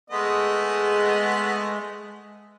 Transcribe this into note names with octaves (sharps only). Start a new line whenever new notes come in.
G#3 A3 B3 D#5